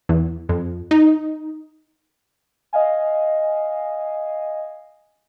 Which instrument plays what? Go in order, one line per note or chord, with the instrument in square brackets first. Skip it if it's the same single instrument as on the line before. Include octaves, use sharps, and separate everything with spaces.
[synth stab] E2
F2
D#4
[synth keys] D#5 F5 G#5